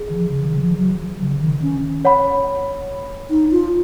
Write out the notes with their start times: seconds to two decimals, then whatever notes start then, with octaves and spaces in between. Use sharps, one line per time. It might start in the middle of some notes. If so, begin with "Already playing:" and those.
Already playing: G#4
0.09 D#3
0.15 F3
0.31 C#3
0.46 D#3
0.58 F#3
0.62 F3
0.78 F#3
1.20 C#3
1.40 D#3
1.62 C#4
2.05 C#5 F#5 B5
3.30 D#4
3.52 F4